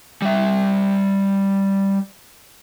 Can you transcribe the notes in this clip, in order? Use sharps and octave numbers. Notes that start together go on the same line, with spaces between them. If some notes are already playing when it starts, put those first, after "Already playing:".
G3 E5